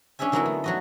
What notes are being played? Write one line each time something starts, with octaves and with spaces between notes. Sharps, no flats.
C#4 D4 G#4 E5 G#5
D3 F#3 A#3 B3 D#4 E4
A3
F#3 F#4 D#5